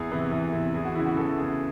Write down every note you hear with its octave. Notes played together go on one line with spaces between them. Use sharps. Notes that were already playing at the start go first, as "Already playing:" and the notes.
Already playing: E2 G#4
C3 E3
E2
C3 E3
E2 G#4
F#4
C#3 E3 E4
F#4
E2 A4
C#3 E3 G#4